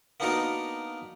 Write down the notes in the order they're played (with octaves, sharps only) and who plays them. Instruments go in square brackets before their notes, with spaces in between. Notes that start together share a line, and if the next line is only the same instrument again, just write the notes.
[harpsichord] A#3 B3 D4 D#4 F#4 A#4